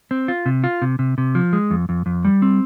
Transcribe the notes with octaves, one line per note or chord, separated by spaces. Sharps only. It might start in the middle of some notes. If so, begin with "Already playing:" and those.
C4
F4
C3
F4
C3
C3
C3
F3
G#3
F2
F2
F2
G3
C4